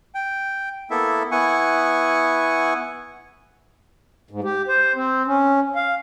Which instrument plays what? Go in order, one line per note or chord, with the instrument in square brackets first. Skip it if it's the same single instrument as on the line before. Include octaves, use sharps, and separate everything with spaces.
[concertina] G5
A#3 B3 E4 A4 E5
B3 E4 F#5 G#5 C#6
[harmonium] G#2
G4
C5
C4
C#4
F5